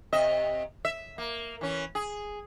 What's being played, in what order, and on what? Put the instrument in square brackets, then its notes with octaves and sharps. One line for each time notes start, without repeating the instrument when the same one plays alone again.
[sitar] C3 D#5 E5
E5
A#3
E3 C#4
G#4